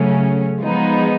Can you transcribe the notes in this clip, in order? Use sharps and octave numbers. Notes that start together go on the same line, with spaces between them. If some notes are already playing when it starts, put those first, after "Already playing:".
Already playing: C#3 F#3 A3 C#4
F3 G#3 B3 D#4